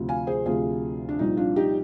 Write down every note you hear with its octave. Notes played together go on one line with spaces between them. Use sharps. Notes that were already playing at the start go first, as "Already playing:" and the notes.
Already playing: D2 C3 F3
F5 G#5
G#4 C5
D2 C3 F3 F4 G#4
D4
C2 A#2 F3 D#4
D4 F4
D#4 G4